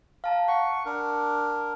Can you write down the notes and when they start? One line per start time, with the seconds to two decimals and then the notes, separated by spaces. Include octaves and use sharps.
0.24 F5 A5 A#5
0.48 F#5 C#6
0.86 D4 A#4